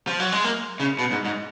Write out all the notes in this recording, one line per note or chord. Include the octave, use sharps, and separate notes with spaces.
F3
F#3
G#3
A#3
C#3
B2
G#2
G#2